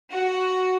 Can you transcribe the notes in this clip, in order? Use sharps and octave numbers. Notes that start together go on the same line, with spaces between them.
F#4